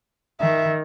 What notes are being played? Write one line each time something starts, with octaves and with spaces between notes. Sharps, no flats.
D#3 E5